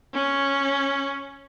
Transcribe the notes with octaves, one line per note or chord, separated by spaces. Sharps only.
C#4